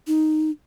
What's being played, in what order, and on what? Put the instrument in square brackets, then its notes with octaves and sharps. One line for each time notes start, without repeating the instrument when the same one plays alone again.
[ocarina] D#4